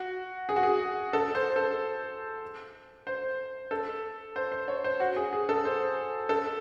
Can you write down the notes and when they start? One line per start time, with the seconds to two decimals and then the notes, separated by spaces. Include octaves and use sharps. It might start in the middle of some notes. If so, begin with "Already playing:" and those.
Already playing: F#4
0.49 G#4
0.56 F#4
0.63 G#4
1.13 A4
1.35 C5
1.56 A4
3.07 C5
3.71 A4
4.36 C5
4.52 C5
4.68 C#5
4.84 C5
5.00 F#4
5.16 G#4
5.33 G#4
5.49 A4
5.65 C5
6.29 A4